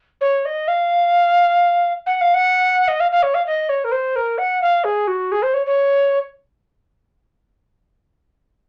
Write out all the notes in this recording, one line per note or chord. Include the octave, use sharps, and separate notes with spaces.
C#5
D#5
F5
F#5
F5
F#5
D#5
F5
F5
C#5
F5
D#5
C#5
A#4
C5
A#4
F#5
F5
G#4
F#4
G#4
C5
C#5
C#5